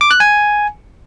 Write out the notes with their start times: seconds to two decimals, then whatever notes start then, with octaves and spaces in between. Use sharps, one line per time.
0.01 D6
0.11 F#6
0.20 G#5